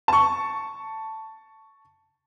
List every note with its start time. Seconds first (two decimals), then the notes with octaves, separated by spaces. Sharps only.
0.08 A5 C#6